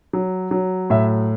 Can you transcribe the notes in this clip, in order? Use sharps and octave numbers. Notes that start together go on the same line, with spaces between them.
F#3
F#3
A2 E5